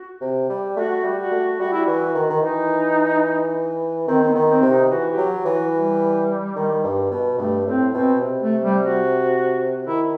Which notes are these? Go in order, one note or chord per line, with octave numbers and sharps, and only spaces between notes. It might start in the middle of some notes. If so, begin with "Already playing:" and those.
Already playing: F#4
C3
G3
A3 F#4
G3
F#4
A3
G3 F#4
E4
E3 F#4
D#3
D#3
E3 D#4
D#3 C4
C4
B3
D#3
C4
C3
D#4
E3 F#4
G4
F#3
G4
E3
F#4
G3
D#3
G2
B2
G2 A3
A2 C4
B2 C4
C3
A3
G3
F#4
D#3 E4